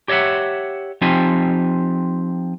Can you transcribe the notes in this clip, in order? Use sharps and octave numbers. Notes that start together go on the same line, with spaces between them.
G4 C#5 D#5 E5 F#5
F3 C4 D#4 G4 G#5